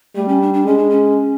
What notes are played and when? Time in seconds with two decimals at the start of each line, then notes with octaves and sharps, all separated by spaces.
0.15 G3 A3
0.28 C#4
0.42 D4
0.54 D4
0.66 G#3 C#4
0.78 D4
0.90 C#4